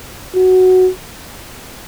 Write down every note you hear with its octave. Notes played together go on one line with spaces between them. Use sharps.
F#4